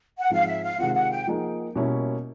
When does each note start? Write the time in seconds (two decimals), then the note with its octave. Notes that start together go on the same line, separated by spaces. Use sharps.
0.19 F#5
0.30 G#2 F3 G#3 C4 F5
0.46 E5
0.63 F5
0.79 C3 D#3 G#3 C4 F4 F#5
0.94 F#5
1.11 G5
1.27 F3 A#3 D#4 G#4
1.75 B2 G3 A#3 C#4 E4